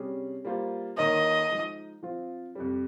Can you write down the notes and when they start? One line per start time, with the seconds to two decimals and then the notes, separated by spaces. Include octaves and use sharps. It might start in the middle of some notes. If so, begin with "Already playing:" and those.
Already playing: C3 G3 C#4 G#4
0.45 G3 A#3 F4 C5
0.97 D#3 A#3 D#4 A#4 C#5 D#5
1.50 F3 G#3 D#4
2.03 F3 C4 F4
2.55 F2 C3 G3